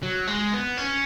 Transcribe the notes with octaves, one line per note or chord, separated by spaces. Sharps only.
F#3
G#3
B3
C#4